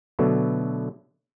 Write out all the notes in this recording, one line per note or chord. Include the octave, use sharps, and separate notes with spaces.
B2 D3 F#3 A3 B3